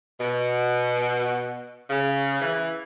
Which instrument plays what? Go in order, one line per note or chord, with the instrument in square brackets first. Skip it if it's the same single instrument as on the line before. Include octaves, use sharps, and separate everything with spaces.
[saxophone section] B2
C#3
E3